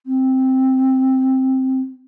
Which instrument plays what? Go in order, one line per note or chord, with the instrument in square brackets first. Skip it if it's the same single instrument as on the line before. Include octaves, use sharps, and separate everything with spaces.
[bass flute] C4